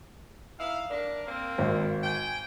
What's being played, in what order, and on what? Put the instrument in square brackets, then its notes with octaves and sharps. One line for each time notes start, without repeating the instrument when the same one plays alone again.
[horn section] D#4 E4 F5
D4 A#4
A#3 C4
[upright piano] G#1
[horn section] G5 G#5